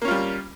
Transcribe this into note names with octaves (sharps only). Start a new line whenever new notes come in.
G3 A#3 C#4 F4